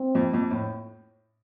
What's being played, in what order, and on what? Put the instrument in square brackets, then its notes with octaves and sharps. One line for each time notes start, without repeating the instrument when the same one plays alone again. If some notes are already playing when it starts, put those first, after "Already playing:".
Already playing: [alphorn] C4
[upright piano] F2
F2
A2